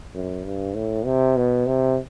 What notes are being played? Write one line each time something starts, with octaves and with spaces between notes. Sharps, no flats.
F#2
G2
A2
C3
B2
C3